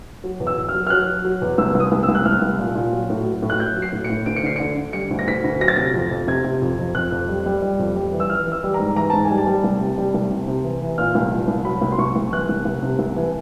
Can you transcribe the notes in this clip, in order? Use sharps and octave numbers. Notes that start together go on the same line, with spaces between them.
F#3
E2
E6
E2
F6
F#3
F6
F#3 F#6
F#3
F#3
E2
C2 E6
C2
D#6
C2
E6
C2
F#6
C2 F6
C2
A#2
A#2
F#3
A2
F#3
A2
F#6
F#3 G6
F#3
C7
A2
C#7
A2
D2 D7
C#7
D3 C7
D3 C#7
D3
G3 C#7
D2
A#6
D2 B6
D2
F#3 A#6
A6
C3 A#6
F2
F2
C3 G#6
C3
F2
F2
F2 F#6
F2
G3
G3
G3
F2
G3
E3
E6
E3 F6
E3
E6
G3
A#5
G#2
E3 A#5
G#2 A5
G#5
G3
A5
G3
C2
C3
G3
C2
C3
C3
E3
E3
A#2 F6
C2
A#2
C2
F#3 B5
C2
C6
C2 C#6
C2
E3 F#6
C2
C2
C3
C2
E3